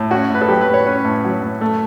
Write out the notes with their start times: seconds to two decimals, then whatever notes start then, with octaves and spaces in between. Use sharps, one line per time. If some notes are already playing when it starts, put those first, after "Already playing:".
Already playing: A2
0.11 C#4 F#4
0.30 A2 B4
0.42 A4
0.48 F#3 G4
0.61 B4
0.68 A2
0.74 C#5
0.86 C#4 B4
1.04 A2
1.24 F#3
1.42 A2
1.61 A3